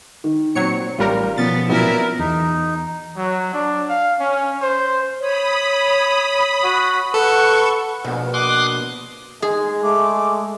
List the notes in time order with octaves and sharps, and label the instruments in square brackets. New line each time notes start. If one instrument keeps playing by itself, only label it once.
[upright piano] D#3
[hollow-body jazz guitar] A#2 C4 [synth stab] F#3 C#5 C#7
[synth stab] A1 G3 A#4 [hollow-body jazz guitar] F4
[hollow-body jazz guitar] B2 F3 C#4 [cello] B3 [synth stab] A6
[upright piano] A#2 F#3 B3 [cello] E4 A#4
[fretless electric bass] E2 [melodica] D#4
[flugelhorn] F#3
D4
F5
C#4
C5
[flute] C#5 [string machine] B5 D#6
[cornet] F#4
[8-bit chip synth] A4 [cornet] B4 [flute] F#5 [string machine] C#6
[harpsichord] A#1 [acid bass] B2
[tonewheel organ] C6 D#6 F#6 [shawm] D6
[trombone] G#3 [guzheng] G#4
[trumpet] G#3 [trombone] A3 [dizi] D6